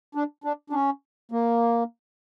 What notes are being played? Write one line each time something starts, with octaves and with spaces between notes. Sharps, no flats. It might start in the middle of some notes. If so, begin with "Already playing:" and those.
D4
D4
D4
C#4
A#3